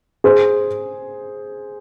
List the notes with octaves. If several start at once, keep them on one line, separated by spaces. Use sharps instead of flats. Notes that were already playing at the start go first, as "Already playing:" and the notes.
G#4 C5